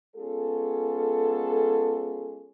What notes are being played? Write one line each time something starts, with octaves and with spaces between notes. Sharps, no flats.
G#3 B3 C#4 F4 G#4 A4